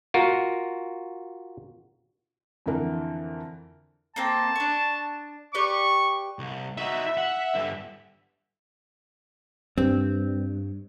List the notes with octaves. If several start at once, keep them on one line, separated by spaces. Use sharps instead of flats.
F4 F#4 A#4
F2 D3 E3 A#4
A#3 C4 G5 A5
D4 C#6
G4 B4 D5 C#6
C2
D#4 F#4 E5
F#5
G2 D3
G2 C4